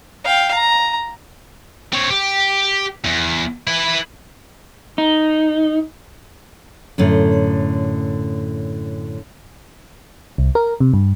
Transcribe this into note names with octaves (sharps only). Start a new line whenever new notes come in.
F5 G5
A#5
C4 C#5
G4
E2
E4 B4
D#4
F#2 A2 D3
C2
A#4
C3
G2